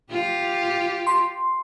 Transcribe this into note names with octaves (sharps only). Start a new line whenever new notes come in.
F4 G4
C6